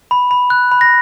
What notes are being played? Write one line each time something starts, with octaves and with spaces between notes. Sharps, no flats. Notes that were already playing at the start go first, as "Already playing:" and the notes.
B5
B5
F#6
B5
A#6